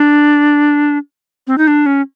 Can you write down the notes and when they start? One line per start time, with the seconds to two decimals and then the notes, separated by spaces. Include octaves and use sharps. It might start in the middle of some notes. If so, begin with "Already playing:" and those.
Already playing: D4
1.47 C4
1.58 D#4
1.67 D4
1.86 C#4